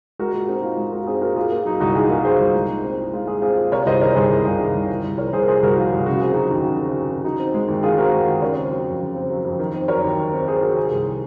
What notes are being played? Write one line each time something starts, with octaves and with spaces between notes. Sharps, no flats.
G#3 F#4 A#4
A#2
C4 D#4 F#4
A#2 F4
G#3 F4
A#2 D#4 F#4
C4 F4 G#4
A#2 F#4 A#4
A#2 F4 G#4
A#3
F#3 D#4
C2 D#4 F#4
A#2 F4 G#4
A#3 F4 G#4
F#3 G#4 C5
C2
G#3 D#4
A#2
C4
A#2
G#3 F4
A#2 F4 G#4
C4 F4 G#4
A#2
C3 A#4 C#5
C2 C5 D#5
D#3 A#4 C#5
C2 G#4 C5
C3
C2 F4 G#4
D#3
C2
A#2
C2
F3 A#4 C#5
C2 G#4 C5
A#4
A#2 G#4 C5
C2 F#4 A#4
F3 F4
C2
C#3 F#4
C4 G#4
F#3 D#4 F#4
D#2
C#3
C4
F#3
D#2
D#3 D#4 F#4
C4
G#3
D#2
D#3 F4 G#4
C4 F#4 A#4
G#3
D#2
C#3 A#4 C#5
C4
F#3
F2
C#3
C4
F#3
F2
D#3
C4
F#3 A#4 C#5
D#2
D#3
C4
F#3 G#4 C5
D#2 F#4 A#4
C3 G#4 C5
C2
D#3